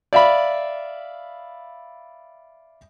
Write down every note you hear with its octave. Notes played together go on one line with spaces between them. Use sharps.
D5 E5 F5 B5